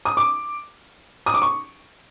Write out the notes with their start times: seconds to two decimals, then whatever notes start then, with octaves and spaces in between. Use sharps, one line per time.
0.05 D#6
0.17 D6
1.26 D#6
1.34 D6
1.42 C#6